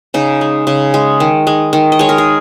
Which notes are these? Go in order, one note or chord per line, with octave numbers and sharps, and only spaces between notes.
C#3 D#4
G#3
C#3
G#3
D#3
G#3
D#3
D#5
G#3 C#5
A#4
G#4